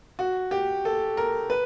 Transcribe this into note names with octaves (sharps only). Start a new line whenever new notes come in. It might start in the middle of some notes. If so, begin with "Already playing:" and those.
F#4
G4
A4
A#4
B4